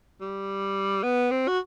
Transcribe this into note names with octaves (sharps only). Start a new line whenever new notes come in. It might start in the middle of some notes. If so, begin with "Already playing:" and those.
G3
B3
C4
F#4